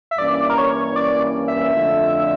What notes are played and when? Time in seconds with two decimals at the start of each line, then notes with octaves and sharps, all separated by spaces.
0.11 E5
0.18 G2 E3 A#3 C#4 E4 D5
0.50 A#4
0.58 C#5
0.96 D5
1.48 E5
1.73 F2 D3 A3 D4 F4